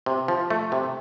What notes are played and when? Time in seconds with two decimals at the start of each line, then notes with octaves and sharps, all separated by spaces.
0.06 C3
0.28 F3
0.50 A3
0.72 C3